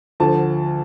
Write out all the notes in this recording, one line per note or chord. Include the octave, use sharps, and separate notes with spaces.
D2 D3 F3 A5